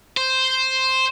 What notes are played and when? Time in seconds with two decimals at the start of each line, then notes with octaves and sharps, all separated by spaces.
0.17 C5